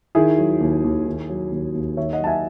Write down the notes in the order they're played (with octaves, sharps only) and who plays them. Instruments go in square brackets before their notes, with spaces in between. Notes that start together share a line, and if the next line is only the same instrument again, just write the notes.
[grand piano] D#3 E4 G#4
F#3
D#2
D#2
D#3
F#3
D#2
D#2
D#3 C#5 E5
D#5 F#5
F#3 A5
E5 G#5